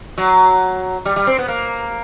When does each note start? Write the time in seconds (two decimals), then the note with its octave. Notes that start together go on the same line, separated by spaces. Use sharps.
0.18 F#3
1.05 G3
1.16 G3
1.27 C4
1.38 B3
1.48 A#3